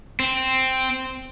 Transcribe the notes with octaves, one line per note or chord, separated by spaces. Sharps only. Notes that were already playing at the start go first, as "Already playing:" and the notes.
C4